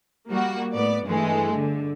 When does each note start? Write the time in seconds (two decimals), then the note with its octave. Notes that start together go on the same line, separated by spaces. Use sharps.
0.28 G3 A#3 F#4
0.73 A2 B3 D5
1.04 G2 E3 G#3 A3
1.55 D3